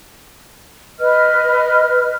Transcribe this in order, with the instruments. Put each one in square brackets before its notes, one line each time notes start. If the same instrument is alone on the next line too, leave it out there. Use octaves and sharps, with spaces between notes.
[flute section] B4 D#5 F6